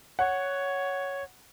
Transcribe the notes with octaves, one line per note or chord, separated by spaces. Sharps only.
C#5 F#5